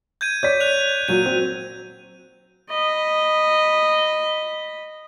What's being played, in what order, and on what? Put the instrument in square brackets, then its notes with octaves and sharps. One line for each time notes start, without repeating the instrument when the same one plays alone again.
[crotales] G6 G#6 D#7
[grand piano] C#5 D5 B6 [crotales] G6
[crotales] F#6 D#7 F7
[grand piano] A#2 F#3 [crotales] D#7
[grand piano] C4
[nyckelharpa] D#5 B5